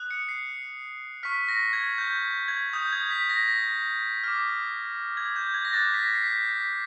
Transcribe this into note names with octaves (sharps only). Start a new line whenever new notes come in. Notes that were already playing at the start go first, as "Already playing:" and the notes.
Already playing: D#6 F#6
C#7
C7
C#6 F6 B6
A#6
G#6
G6
G#6
D#6 G6
G#6
B6
A#6
A#6
D6 F6
G#6
G6
G#6
A#6
D6 F#6 A6
B6
A#6
C7
B6
B6